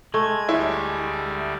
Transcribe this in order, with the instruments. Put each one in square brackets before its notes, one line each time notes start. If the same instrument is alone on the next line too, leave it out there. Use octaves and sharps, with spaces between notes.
[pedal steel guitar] G#3 [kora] A3 [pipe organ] G#6
[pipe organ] D2 G3 [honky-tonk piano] E4